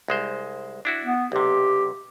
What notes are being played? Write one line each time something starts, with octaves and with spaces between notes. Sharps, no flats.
C2 G#3 C5
D4 E4 F#4
B3
B1 C3 G4